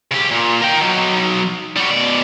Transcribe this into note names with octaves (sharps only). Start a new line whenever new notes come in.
C#3 G4
A#2
A#4 G5
F#3 D#4
G3 F#4
B2 D5